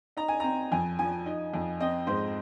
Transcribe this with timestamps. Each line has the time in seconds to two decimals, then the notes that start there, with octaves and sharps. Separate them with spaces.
0.17 D#4 A#5
0.28 G#5
0.40 C4 A#5
0.72 F2 G#5
0.99 F3 G#5
1.26 D#4
1.54 F2
1.80 C4 D#5
2.07 G#2 C5